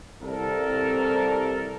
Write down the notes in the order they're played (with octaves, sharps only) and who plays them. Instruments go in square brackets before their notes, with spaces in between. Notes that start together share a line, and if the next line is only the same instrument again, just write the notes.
[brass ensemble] C2 A4 A#4